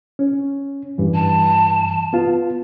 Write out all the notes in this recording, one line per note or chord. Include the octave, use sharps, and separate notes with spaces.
C#4
G2 E3
A5
B3 F4